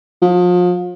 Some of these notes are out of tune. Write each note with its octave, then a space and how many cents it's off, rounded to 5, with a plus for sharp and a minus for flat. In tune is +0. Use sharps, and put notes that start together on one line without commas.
F3 +35